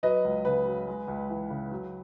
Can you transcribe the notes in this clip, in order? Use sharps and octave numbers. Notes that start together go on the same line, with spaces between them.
F#3 B4 D#5
C#2
C#3 B4
F#3
G#3
C#2
E3
C#3
F#3